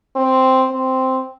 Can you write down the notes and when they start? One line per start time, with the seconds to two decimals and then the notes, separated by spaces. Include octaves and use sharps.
0.16 C4
0.70 C4